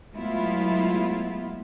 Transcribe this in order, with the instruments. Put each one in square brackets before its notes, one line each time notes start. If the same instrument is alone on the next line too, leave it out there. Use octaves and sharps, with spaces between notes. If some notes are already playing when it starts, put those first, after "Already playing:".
[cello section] F#3 G#3 A3 B3 E4 F4